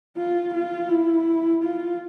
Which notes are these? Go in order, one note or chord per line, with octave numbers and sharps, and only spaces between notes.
F4
F4
E4
F4